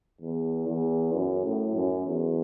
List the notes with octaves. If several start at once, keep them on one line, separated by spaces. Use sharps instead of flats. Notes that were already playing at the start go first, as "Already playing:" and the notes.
E2
E2
F#2
A2
F#2
E2